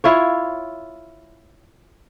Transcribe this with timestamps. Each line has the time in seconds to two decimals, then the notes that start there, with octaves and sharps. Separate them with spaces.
0.04 E4 F4 C#5